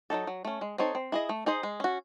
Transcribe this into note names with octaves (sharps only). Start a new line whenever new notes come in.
F#3 A3 D#4 A4
F#3
A3 C#4
G#3
C4 D#4 A4 C#5
C4
E4 G#4 D#5
A3
D#4 G#4 C5 D#5
G#3
C#4 F#4